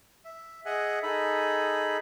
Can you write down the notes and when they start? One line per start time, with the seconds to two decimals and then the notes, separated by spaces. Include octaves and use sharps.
0.25 E5
0.65 G#4 D#5 E5 F#5
1.03 D#4 G#4 A4 B5